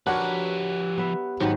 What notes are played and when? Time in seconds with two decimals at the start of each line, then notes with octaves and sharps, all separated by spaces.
0.07 F3 D4 F#4 G4 A#4 B4 C#5 F#5
0.98 B3 E5
1.40 G#2 D#3 F#3 B3 F#5